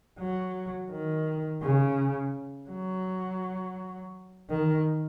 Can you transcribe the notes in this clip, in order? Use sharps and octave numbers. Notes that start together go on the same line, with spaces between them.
F#3
D#3
C#3
F#3
D#3